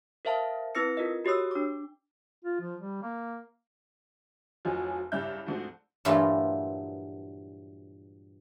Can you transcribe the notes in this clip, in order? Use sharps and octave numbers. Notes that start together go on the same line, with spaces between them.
A#4 C5 E5 F5 A5
C4 E4 B4 E6 A#6 C#7
F4 A#4 D#5
F#4 G4 C#5 D#6 E6
D4 D6
F4
F3
G3
A#3
F1 F3 F#3 D#5 G#5
C2 G2 C#3 D5 E5 G6
G#2 F3 A3 C4 D4 F#4
G2 A#2 E3 F#3 A3 F4